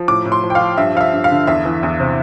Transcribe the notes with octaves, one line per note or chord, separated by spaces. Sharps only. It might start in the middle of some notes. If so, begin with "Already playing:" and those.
Already playing: F3
A2 D6
A2
C6
F3
G5
F5
F3
G2 E5
F3 F5
E5
G2
F5
D3
E2 E5
E3
E2
C3